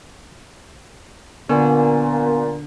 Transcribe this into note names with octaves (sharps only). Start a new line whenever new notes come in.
A#2 D3 B3 G#5